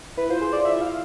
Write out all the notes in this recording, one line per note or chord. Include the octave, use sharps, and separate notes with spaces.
E4 B4
F4 C5
G#4 C5
G#4 D5
F4
E4 E5
F4
F5